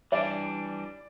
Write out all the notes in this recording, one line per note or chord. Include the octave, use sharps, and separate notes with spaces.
E3 G3 D4 D5